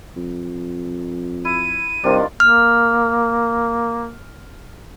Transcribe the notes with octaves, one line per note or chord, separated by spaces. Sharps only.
F2
E4 D#7
C2 C3 D#3 D4 F4
A#3 F6